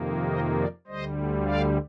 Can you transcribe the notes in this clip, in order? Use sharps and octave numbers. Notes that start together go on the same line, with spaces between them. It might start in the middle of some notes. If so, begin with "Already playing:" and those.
Already playing: F2 C3 D#3 A#3
C5 D#5
A#4 D5
D2 D3 G3 C5 D#5
D5 F5